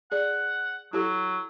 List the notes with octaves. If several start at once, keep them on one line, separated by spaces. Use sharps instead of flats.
G#4 D5 F#5
F#3 E4 G4 A4